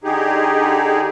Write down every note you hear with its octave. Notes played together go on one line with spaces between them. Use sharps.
D3 D#4 G4 G#4